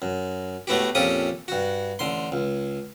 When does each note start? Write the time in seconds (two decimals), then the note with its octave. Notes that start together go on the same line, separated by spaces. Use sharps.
0.02 F#2
0.67 A2 A3 B3 F#4 G4
0.95 A#1 F2 C#4 G4 A4 D#6
1.48 G2 F#4
1.99 A1 D3 C6
2.32 C#2